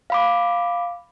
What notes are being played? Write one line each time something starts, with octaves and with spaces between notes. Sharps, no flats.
F5 B5 D6